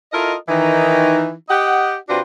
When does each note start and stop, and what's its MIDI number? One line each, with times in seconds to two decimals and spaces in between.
0.13 0.34 64
0.13 0.34 65
0.13 0.34 69
0.13 0.34 70
0.13 0.34 75
0.49 1.32 51
0.49 1.32 52
0.49 1.32 63
1.49 1.95 67
1.49 1.95 75
1.49 1.95 78
2.09 2.20 48
2.09 2.20 60
2.09 2.20 62
2.09 2.20 65
2.09 2.20 66
2.09 2.20 71